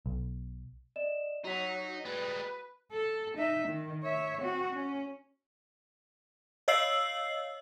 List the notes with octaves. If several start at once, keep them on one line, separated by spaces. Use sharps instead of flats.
B1
D5 D#5 E7
F#3 D#4 F#4 B6
G3 G#3 B4
A4
D#4 E5
D#3
C#5 E5
C4 F#4
C#4
C#5 D#5 F5 E6 C7 F#7